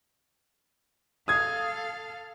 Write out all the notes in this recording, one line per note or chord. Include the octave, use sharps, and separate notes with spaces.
A4 F5 D#6 G#6